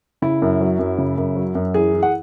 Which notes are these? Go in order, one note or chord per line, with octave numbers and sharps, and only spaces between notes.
C#3 E4
F#2
F#3
F#2
C#3
F#2
F#3
F#2
E3 G#4
E3
F#5